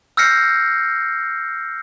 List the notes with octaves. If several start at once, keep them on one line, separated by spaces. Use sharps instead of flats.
E6 F6 G6 A#6 C7 C#7